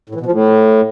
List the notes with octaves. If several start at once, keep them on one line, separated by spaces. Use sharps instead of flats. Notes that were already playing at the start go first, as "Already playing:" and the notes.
A2
E3
B2
F3
A2